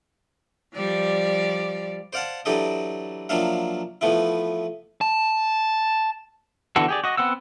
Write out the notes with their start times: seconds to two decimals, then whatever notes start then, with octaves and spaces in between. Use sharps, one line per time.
0.76 F3 G3 D5
2.13 C5 D5 F5 F#5 A5
2.45 E3 F#3 D4 G4 A4 D#5
3.29 F3 F#3 A#3 D4 E5 F5
4.01 E3 F3 A3 B3 E4
5.01 A5
6.76 D3 E3 B3 F#4 A4
6.88 G4 G#4 D5
7.04 F#4 D#5
7.17 B3 C4 F#5 E6